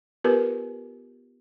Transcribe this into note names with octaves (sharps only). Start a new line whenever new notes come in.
B3 F4 G4 A#4 B4